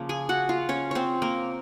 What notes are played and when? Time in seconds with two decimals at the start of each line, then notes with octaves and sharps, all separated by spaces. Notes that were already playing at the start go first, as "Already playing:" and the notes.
Already playing: C#3 F3 A#3
0.09 G#4 G#5
0.29 F#4 F#5
0.49 F4 F5
0.69 C#4 C#5
0.91 C4 C5 C#5
1.22 A#3 A#4